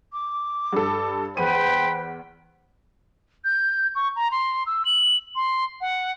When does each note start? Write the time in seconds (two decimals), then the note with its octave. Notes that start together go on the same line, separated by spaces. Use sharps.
0.13 D6
0.73 G2 A4
1.37 E2 B4 C5 G5 B5 D#7
3.45 G6
3.95 C#6
4.16 A#5
4.31 C6
4.66 E6
4.85 F#7
5.36 C6
5.81 F#5